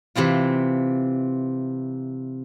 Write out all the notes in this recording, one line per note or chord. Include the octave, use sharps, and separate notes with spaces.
C3 E3 C4 F4